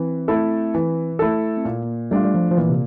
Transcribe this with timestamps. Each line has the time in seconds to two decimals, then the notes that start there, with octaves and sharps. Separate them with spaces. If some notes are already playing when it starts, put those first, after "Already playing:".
Already playing: E3 C4
0.28 A3 E4 A4
0.75 E3
1.19 A3 E4 A4
1.57 C4
1.65 A#2 A#3
2.11 G3 A3 D4 F4
2.25 G3
2.34 F3
2.51 F3
2.57 A#2 E3
2.69 C3